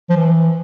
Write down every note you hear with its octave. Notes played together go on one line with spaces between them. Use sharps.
F3
E3